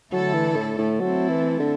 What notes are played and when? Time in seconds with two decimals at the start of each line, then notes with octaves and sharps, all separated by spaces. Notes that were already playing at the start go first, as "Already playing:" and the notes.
0.12 D3 F#3 A3 E4 A4
0.34 E3
0.56 A2
0.78 A2
1.00 F#3 A3 C4 E4 A4
1.29 E3
1.59 D3